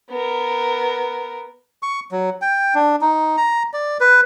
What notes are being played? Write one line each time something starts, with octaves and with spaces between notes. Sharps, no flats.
B3 A#4
C#6
F#3
G5
D4
D#4
A#5
D5
B4